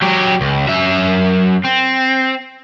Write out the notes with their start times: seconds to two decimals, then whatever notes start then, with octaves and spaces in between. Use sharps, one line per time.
0.02 F#3 G4
0.41 C#2
0.69 F#2 E5
1.65 C4